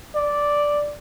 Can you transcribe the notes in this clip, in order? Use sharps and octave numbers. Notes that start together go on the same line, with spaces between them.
D5